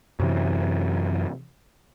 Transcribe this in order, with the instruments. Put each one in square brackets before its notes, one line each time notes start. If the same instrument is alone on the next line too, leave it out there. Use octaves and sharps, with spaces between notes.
[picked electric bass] F#2 C3 E3